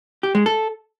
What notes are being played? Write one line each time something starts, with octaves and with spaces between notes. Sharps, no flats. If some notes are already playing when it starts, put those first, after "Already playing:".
G4
G#3
A4